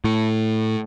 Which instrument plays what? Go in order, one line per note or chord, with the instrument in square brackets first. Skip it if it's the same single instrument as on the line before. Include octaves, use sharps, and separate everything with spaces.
[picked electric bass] A2